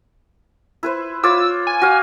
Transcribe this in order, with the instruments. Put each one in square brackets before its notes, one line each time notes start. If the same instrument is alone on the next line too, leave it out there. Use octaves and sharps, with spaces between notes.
[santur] E4 B4 C5
[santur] F4 C#5 D6 [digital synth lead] E6
[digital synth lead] G#5
[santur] F#4 F5